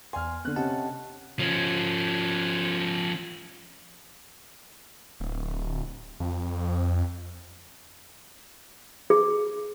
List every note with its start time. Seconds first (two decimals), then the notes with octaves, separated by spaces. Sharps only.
0.13 E2 G#5 C6 F6
0.45 D3 B3 F#6
0.56 C3 C#4 D#5 F#5 A5
1.39 F3 C#4
5.20 D1
6.20 F2
9.10 G#4